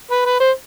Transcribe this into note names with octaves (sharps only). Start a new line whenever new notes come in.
B4
B4
C5